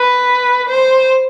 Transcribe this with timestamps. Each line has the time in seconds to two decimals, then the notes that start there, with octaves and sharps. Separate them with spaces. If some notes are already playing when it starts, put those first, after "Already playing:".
Already playing: B4
0.70 C5